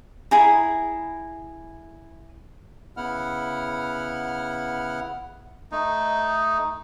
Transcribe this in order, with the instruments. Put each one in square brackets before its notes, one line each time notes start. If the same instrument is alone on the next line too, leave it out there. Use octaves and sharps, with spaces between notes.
[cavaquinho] E4 G#4 A#5
[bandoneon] C#3 B3 E4 F#5 F6
[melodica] A3 D#4